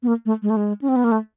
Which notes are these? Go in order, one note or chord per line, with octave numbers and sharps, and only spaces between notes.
B3
A#3
A3
G#3
A3
G#3
C#4
C4
B3
A#3
A3